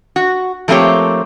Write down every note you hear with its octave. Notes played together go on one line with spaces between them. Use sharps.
F#4
F3 A3 A#3 C4 G4 C#5